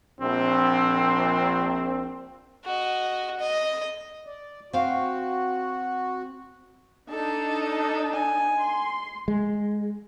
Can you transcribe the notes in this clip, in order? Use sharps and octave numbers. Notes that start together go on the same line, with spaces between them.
A#1 C4
F#4 D#5
D#5
D5
C4 F#4 F5
D4 D#4 A4 A5
D#5
G#5
C6
G#3